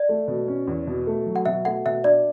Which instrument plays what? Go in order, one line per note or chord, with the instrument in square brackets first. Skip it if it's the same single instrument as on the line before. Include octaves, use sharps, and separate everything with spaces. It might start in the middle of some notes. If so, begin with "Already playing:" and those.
Already playing: [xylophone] D5
[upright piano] A3
B2
C#4
E2
B2
A3
F#3
[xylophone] F#5
[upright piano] B2 [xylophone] E5
[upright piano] A3 [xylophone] F#5
[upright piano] B2 [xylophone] E5
[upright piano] D4 [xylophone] D5